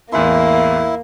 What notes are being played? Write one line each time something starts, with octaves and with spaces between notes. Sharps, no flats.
A1 E2 A#3 E4 C6